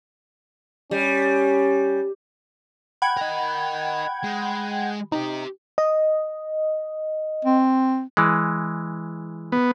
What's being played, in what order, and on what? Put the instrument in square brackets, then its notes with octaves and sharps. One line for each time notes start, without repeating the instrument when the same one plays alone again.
[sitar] G3 [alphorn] C#4
[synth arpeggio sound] F#5 G5 G#6 [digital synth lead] B5
[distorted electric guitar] A#4 D#5
G#3
[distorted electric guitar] C4 G4 [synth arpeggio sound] D#4
[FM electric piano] D#5
[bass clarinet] C4
[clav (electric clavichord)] E3 G#3
[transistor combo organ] B3